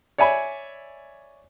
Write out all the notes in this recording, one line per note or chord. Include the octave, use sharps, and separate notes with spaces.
C#5 D5 E5 G#5 B5